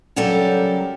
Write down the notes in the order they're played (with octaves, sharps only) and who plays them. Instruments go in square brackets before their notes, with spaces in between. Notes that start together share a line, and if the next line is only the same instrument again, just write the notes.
[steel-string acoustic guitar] C#3 F#3 G3 G4 A4 A#4